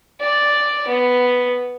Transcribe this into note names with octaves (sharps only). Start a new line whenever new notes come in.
D5
B3